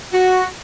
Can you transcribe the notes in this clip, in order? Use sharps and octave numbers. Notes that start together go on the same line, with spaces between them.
F#4